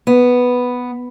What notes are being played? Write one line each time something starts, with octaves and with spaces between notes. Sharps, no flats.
B3